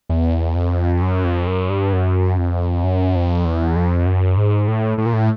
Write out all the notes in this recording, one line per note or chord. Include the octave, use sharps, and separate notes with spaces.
E2
F2
F#2
F2
F#2
G2
F#2
F2
F#2
F2
E2
F2
F#2
G#2
A2
A2
A#2
A2